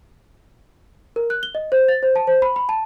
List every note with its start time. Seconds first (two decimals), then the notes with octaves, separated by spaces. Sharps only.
1.16 A#4
1.30 F#6
1.43 G7
1.55 D#5
1.72 C5
1.88 A6
2.03 C5
2.16 A5
2.27 C5
2.42 B5
2.56 B5
2.69 A5